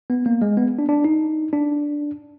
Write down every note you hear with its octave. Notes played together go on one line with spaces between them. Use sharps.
B3
A#3
G#3
B3
D4
D4
D#4
D4